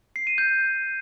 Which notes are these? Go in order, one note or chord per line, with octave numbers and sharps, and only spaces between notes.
C7
D#7
G6